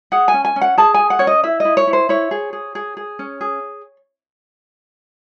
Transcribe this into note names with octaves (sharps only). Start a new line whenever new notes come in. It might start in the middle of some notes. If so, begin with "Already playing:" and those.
G#4 F#5
G#5
C#4
G#5
C#4
F#5
G#4 A5
G#4 G#5
F#5
C#4 C#5
D#5
E4 E5
E4 D#5
C#5
E4
C5
E4 C#5
G#4
G#4
G#4
G#4
C#4
G#4